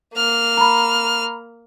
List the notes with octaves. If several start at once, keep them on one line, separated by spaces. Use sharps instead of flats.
A#3 F6
A#5 B5